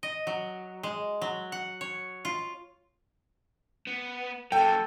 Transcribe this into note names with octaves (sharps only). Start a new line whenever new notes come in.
D#5
F#3
G#3
F#3
F#5
C#5
F4
B3
F#3 A#3 A4 G5